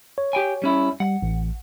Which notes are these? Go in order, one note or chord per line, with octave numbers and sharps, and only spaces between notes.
C#5
G4 G5 G#5
G3 C#4 E4
G3 F#5
A1